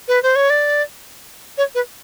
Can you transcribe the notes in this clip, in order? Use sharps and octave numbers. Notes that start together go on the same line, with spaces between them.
B4
C5
C#5
D5
C#5
B4